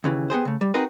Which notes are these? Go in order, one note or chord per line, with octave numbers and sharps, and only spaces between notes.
D#2 C#3 E3
B3 G4 G#4 C5
C#3 A3
G3
C4 D#4 F#4 G#4 A#4 B4